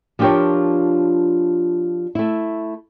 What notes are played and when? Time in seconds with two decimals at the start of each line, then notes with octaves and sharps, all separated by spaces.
0.19 F3 D4 F4 G4 A#4 C#5
2.15 A3 E4